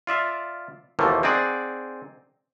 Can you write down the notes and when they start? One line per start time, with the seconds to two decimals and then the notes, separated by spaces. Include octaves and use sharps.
0.07 F4 D5 E5 F5
0.99 D#2 B2 E3 F3 A3 A#3
1.23 C4 D#4 G#4 D5 F#5